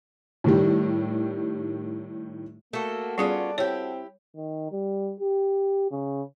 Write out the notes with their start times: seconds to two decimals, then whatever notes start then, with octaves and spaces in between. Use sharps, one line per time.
0.44 A2 D#3 G3
2.73 A3 A#3 F#4 A4
3.18 G3 B3 C#4 F4 G#4 D5
3.58 C4 E4 G4 C#5
4.36 D#3
4.72 G3
5.21 G4
5.91 C#3